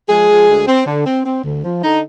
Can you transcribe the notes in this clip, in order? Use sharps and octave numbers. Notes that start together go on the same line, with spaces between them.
F3 G#3 G#4
F3
D2
C4
D3
C4
C4
D2
F3
D3 D#4